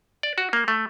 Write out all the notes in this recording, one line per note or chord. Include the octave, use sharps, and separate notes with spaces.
D5
F#4
A#3
A3